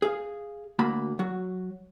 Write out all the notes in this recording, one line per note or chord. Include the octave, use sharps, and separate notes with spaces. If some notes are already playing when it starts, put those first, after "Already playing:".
G#4 F5
D2 A#3 F#4 B5
F#3 F#4